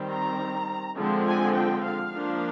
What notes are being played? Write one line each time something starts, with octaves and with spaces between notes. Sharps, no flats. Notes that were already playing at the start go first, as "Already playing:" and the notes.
Already playing: D#3 G3 C4
A#5
D3 F3 G#3 C4
G#5
G5
F5
F3 A#3 D4